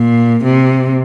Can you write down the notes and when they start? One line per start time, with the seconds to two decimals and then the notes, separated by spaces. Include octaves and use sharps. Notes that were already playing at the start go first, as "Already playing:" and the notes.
Already playing: A#2
0.44 C3